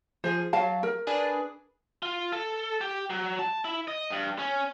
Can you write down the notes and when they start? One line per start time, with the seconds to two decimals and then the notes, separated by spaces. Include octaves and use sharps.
0.24 F3 G#4 C5
0.53 F#3 F5 A5
0.83 A#4
1.07 D4 G#4 B4
2.03 F4
2.33 A4
2.81 G4
3.10 F#3
3.39 A5
3.65 E4
3.88 D#5
4.10 G2
4.39 C#4